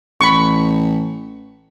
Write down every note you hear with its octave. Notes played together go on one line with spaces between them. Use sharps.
A1 B5 C#6